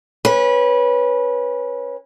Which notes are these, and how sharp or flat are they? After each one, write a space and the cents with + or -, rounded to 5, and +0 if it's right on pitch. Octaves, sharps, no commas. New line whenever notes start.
C#4 -15 B4 -25